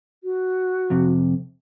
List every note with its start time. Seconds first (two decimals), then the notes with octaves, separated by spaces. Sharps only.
0.24 F#4
0.90 F2 C3